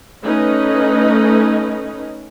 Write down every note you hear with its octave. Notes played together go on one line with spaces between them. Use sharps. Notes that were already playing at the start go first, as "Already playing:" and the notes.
A3 C#4 D#4 B4 D#5